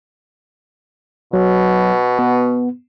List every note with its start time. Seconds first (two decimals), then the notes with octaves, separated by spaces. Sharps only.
1.33 B2 F#3
2.19 B3